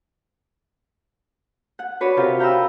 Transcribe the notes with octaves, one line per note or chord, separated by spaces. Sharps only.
F#5
D4 F#4 B4 C#5
C3 F4 G4 A#4
F5 G5 A#5 B5 E6